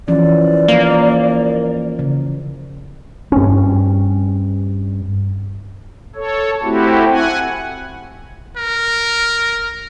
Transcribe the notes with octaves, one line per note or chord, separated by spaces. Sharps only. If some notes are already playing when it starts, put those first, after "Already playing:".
E3 F3 C#4 D5
F3 A#3
C#3
G2 C4 C#4
A4 C#5
A3 C4 E4 F#4 G4
F#5 G#5
A#4